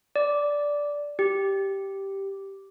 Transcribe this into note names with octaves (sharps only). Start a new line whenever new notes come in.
D5
G4